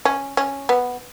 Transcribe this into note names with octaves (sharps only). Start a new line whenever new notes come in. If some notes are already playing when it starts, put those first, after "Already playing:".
C#4
C#4
B3